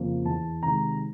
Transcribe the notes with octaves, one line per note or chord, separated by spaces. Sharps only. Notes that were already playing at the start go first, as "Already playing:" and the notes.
Already playing: F2 C#3 F3 A#3
E2 A5
C3 D#3 G#3 A#5